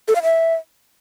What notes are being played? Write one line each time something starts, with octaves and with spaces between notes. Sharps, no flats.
A4
F5
E5